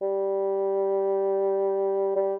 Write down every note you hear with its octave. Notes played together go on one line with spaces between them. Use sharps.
G3
G3